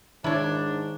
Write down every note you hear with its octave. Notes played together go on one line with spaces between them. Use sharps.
G#2 D#3 D4 E4 C#5